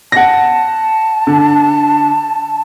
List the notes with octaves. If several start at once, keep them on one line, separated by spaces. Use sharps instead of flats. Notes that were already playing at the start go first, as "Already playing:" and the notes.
F#5 A5 A#6
D3